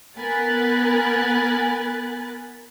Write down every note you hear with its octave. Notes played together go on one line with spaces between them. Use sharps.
B3 A#4 G#5 B5 F#6 A6